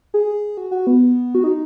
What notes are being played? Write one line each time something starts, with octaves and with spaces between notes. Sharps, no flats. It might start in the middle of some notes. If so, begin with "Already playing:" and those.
G#4
F#4
F#4
B3
F#4
D#4